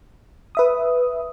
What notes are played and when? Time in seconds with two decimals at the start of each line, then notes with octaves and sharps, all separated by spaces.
0.55 B4 E5 D#6